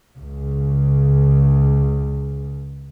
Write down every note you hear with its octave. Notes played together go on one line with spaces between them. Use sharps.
C#2 C#3